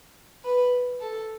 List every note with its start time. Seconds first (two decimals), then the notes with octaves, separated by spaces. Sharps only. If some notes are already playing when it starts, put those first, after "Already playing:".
0.44 B4
1.00 A4